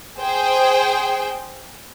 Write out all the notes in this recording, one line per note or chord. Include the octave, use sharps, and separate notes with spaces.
G#4 C5 G5